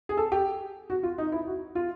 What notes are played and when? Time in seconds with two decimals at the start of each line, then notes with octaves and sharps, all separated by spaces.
0.09 G#4
0.17 A4
0.32 G4
0.90 F#4
1.03 F4
1.18 D#4
1.32 E4
1.47 F#4
1.75 F4